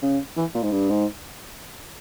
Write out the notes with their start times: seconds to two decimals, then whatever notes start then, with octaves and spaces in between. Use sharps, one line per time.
0.02 C#3
0.36 E3
0.54 A#2
0.63 G#2
0.71 G2
0.90 G#2